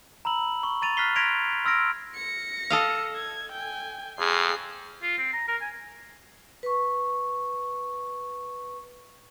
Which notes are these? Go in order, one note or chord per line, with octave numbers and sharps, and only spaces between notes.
A#5 B5 E6 F#7
C#6
A#5 C#6 A6 D#7 F7
F6 F#6 A6 B6 C7 G7
C6 G#6 A#6 B6 D7 F7
C6 E6 F6 G#6 A#6 D7
A#6 C#7
A4 D#5 F5
G#6
G5 G#5
F2 G#4 C7
F4
C4
A#5
A#4
G#5
B4 C#6